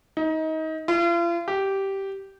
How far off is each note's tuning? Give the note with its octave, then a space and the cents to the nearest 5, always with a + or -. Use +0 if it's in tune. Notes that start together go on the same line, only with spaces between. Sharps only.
D#4 +25
F4 -40
G4 -10